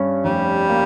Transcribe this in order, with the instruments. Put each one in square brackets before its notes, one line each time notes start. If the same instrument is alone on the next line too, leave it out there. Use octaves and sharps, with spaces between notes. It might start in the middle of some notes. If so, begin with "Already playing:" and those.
Already playing: [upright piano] G2 C#4
[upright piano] F1 [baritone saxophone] G3
[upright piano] A#3